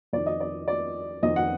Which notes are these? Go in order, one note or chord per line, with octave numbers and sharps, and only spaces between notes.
F2 D#3 D5
D#5
D5
D5
F2 D#3 D#5
F#5